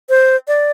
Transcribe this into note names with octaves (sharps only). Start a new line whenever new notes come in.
C5
D5